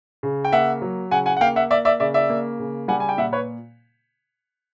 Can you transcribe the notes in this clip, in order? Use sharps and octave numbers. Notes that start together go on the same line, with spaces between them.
C#3
G5
A#3 E5 F#5
F#3
C#3 F#5 G#5
F#5 G#5
F#5
A#3 F5 G5
E5 F#5
A#3 D5 E5
D5 E5
C#3 D5 E5
D5 E5
A#3
C#3
G3 F#5 G#5
G#5
G5
A#2 E5 F#5
B4 C#5